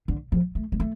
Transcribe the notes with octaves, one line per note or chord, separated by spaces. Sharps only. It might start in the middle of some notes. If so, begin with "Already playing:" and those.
D3
F3
A3
G#3
A3